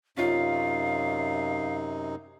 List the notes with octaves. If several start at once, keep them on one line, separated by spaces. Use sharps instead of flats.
F#2 C3 C#4 D#4 F4 F5